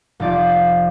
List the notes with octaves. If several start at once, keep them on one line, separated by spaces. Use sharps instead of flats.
F1 F3 D5 A6